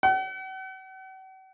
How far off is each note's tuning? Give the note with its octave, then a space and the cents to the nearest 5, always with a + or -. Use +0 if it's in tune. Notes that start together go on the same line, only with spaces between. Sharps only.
F#5 +45